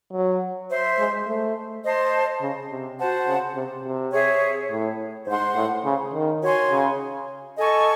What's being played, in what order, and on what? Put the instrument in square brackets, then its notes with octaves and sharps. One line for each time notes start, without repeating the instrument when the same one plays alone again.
[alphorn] F#3
[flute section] C5 E5 C6
[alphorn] G#3
A3
[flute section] C5 D#5 A5 C6
[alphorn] C#3
C3
[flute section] F#4 C5 F#5 A5
[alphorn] C#3
C3
C3
[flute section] G#4 C#5 E5
[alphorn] A2
[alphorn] G#2 [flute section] C5 F#5 C6
[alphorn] A2
C#3
D#3
[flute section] F#4 C#5 G#5 C6
[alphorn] C#3
[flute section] A4 D#5 G#5 C#6